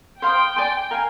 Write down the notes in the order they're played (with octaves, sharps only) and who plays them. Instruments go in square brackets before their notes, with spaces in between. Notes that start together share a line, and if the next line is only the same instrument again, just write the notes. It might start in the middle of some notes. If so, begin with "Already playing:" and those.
[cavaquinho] C5 F5 C6 D#6 [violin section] G5
[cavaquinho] D5 G#5 C6
A#4 F5 G#5